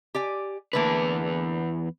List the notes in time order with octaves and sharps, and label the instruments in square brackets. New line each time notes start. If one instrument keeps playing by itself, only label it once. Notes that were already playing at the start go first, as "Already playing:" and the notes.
[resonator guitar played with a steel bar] G4 D5 G#5
[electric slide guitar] E2 B4 [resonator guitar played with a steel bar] D3 A3 A#3